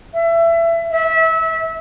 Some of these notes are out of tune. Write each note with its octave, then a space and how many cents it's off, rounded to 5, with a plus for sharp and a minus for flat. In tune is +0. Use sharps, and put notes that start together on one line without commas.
E5 +25
E5 -25